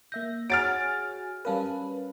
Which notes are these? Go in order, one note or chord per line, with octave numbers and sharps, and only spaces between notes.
A#3 E5 G6 A#6
F#4 G#4 C#5 F#5 G#5 F6 A6 D7
G3 C#4 A#4 B4 F5 A5